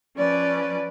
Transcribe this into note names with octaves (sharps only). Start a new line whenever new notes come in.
F3 C#4 B4 D5